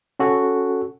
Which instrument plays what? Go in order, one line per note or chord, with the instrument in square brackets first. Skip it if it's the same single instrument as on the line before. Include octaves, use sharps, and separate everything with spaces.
[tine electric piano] C#4 F#4 A4